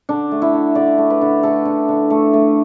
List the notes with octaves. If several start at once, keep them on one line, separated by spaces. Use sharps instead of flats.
D3 D4
A3
E4
D3
D3 D5
A3
B4
D3
A3 A4
D3
D3
A3
A3